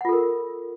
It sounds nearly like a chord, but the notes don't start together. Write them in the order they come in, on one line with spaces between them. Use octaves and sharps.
F#5 F4 A4 A#4